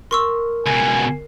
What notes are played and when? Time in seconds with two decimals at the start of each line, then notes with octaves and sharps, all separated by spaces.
0.11 A#4 C6 C#6 E6
0.66 C#2 B2 G#5 G#6